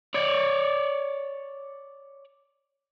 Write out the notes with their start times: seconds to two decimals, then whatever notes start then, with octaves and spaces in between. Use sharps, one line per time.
0.15 C#5 D5